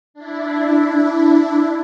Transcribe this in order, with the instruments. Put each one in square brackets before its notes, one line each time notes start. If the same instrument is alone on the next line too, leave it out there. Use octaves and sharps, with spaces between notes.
[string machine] D4 E4